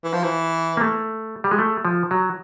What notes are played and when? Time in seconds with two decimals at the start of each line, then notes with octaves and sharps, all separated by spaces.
0.04 E3
0.13 F3
0.24 E3
0.77 A#3
0.81 A3
1.44 G3
1.51 G#3
1.59 A3
1.85 F3
2.11 F#3